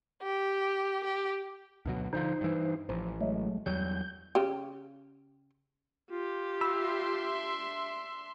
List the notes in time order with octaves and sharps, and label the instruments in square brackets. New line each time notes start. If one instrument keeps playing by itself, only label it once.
[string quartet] G4
G4
[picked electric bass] D2 B2 F#3
[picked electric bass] D3 D#3 F3 [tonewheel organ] D#4 C5
[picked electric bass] G2 E3
[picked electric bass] A1 [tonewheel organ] F3
[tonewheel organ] F#3 G#3 A3
[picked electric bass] E2 F#3 G3 [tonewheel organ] G6
[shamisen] C#3 G4
[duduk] F4 [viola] G4
[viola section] D4 E5 C6 [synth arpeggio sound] B5 E6